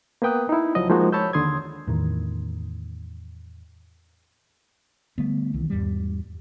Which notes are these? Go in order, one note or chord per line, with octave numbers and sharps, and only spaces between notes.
A#3 B3 B4 G5 D#6 F#6
D#4 E4
C#2 F3 F#3 D#5
F3 G#3 A#3 D#4 F#4
C#5 A5 B5 E6 G6
D#2 D3 C6 D#6 G#6
E2 A2 D#3
D3 G3 A3 B3
C2 D#3 E3
E2 G#2 G3